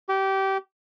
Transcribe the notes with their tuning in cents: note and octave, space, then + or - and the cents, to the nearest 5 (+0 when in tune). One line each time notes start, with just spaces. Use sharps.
G4 -20